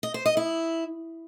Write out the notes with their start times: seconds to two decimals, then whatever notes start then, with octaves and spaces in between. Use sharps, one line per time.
0.03 D#5
0.14 C5
0.26 D#5
0.37 E4